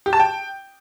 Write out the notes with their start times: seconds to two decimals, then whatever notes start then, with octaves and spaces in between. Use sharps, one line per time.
0.06 G4
0.13 A5
0.20 G5